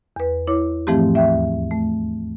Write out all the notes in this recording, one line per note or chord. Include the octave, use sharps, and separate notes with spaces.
E2 B4
E4 C#5 D6
G#2 E3 F3 A3 C4 G4
D#2 E5
A3